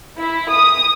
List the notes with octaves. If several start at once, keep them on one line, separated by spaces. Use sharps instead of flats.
E4
D#6